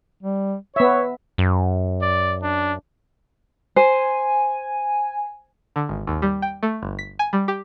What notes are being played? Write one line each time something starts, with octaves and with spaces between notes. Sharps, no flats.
G3
B3 C#5 E5
F#2
D5
D4
C5 G#5
D3
G#1
D#2
G3
G5
A3
G1
B6
G#5
G3
G4